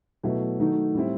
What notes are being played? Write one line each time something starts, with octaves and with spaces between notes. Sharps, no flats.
B2 F#3 A3 E4
D#3 F#3 A3 D#4
A2 G3 C4 E4